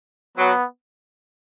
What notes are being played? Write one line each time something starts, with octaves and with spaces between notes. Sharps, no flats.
F#3 B3